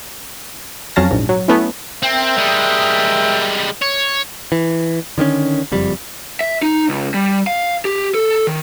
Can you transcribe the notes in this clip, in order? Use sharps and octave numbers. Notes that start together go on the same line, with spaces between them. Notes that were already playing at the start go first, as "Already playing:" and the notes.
F2 F#3 C#4 F5 A5 A#6
A#1 G#2
F#3
A3 B3 C#4 E4
C4 A#4 E5 G5
G3 G#3
C#5
E3
D3 D#3 A3 C#4
F#1 F2 G3
E5
D#4
C#2
G3
F5
G4
A4
D#3